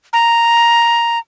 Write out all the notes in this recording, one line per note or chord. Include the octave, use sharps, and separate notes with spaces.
A#5